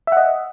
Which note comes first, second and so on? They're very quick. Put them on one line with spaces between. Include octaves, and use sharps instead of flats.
E5 F#5 D#5